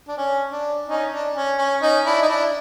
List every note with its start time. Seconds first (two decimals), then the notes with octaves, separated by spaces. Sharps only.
0.08 D4
0.18 C#4
0.52 D4
0.88 C#4 D#4
1.12 D4
1.35 C#4
1.58 C#4
1.82 C#4 D#4
2.05 D4 E4
2.22 D#4
2.28 D4 E4